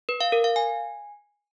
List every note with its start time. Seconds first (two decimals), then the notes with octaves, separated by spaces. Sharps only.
0.09 B4
0.21 F5
0.32 A#4
0.44 F5
0.56 G#5